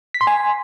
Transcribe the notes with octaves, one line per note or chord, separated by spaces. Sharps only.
B6
C6
G#5